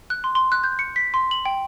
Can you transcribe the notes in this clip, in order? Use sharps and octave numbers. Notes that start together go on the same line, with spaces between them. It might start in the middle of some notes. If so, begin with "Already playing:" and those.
F#6
C6
C6
F#6
G6
C#7
B6
C6
F#7
G5